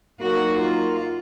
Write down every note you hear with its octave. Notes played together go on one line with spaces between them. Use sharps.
F#3 A#3 D#4 F#4 A#4
F4